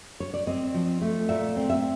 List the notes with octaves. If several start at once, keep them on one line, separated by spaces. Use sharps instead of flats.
C#5
D5
C4 D#5
F3
A3
A#2 E5
C4
E5